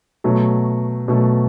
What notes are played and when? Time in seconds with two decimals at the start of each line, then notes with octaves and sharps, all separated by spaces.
0.24 B2 F#3 A3
1.08 B2 F#3 A3